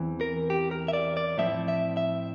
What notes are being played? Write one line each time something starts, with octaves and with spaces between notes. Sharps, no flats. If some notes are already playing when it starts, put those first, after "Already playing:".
Already playing: E2 E3 C4
A#4
G4
A#4
E5
D5
D5
A2 F3 C4 E4 E5
E5
E5